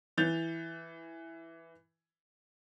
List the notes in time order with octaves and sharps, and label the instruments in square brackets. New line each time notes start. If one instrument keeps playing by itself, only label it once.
[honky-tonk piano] E3 G6 A6 F7